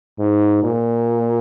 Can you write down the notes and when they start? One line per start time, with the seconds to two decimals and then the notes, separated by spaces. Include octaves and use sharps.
0.19 G#2
0.64 A#2